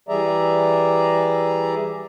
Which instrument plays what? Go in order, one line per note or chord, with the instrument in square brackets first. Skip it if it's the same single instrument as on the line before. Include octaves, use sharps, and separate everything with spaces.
[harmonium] E3 G3 G#4 D5 E5 A#5